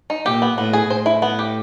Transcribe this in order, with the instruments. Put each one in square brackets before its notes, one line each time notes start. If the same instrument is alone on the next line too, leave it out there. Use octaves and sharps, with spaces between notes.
[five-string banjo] D#4
[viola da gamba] A#2 [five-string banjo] G4
[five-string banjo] B3
[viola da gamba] A2 [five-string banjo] B3
[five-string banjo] G#4
[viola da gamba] A2 [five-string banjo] C5
[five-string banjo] E4
B3
G4